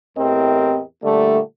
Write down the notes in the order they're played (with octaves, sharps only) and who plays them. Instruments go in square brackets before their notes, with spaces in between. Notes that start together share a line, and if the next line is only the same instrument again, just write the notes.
[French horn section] E2 A2 C4 G4 A#4 D#5
A#2 D3 G3 A3